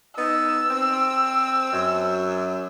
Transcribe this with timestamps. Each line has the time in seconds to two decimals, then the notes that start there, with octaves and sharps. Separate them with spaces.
0.18 B3 D#4 E6
0.71 C4
1.73 F#2